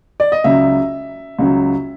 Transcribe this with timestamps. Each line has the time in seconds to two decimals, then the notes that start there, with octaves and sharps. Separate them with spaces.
0.20 D5
0.32 D#5
0.44 C#2 C#3 F#3 E5
1.39 C#2 C#3 F#3